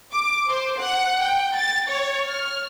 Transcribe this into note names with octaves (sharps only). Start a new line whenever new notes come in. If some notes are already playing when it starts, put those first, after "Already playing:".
D6
C5
F#5
G5
A6
C#5
F6